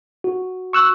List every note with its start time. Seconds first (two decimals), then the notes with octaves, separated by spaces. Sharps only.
0.24 F#4
0.73 C#6 E6 F#6